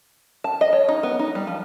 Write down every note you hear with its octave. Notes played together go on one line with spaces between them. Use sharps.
A5
D#5
C#5
D#4
B3
D#4
G3
F3